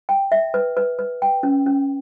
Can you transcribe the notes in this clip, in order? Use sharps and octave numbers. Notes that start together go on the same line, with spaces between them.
G5
E5
B4
B4
B4
G5
C#4
C#4